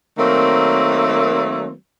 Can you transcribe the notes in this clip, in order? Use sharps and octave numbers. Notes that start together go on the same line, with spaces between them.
D#3 F#3 A3 A#3 C4